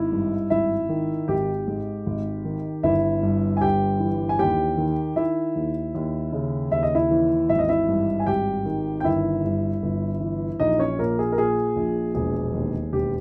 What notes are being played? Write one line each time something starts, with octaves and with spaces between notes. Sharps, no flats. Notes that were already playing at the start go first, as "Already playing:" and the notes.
Already playing: G#1 E4 E5
G2
G#1 E4 E5
D#3
G#1 G4 G5
G#2
G#1
D#3
G1 E4 E5
G2
G#5
G1 G4 G5
E3
G#5
D#2 G4 G5
D#3
D#3 E4 E5
D#2
D#2
C#3
D#2 E5
D#5
E4 E5
E3
G#1 E5
D#5
E4 E5
G2
G#5
G#1 G4 G5
D#3
G5
G1 E4 E5
G2
G1
E3
A#1 D#4 D#5
C#4 C#5
A#2 A#3 A#4
G#4
A#4
A#2 G#4
A#1
E1 G#4
D#2
E1 G4